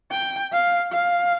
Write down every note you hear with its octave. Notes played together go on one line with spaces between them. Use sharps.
G5
F5
F5